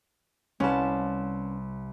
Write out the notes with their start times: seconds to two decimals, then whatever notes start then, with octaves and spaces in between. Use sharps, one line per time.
0.60 C2 C#4 B4 A5